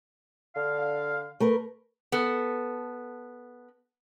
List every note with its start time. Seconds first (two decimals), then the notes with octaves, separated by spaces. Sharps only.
0.56 D3 F5
1.40 A3 A#4 B4
2.12 B3 A4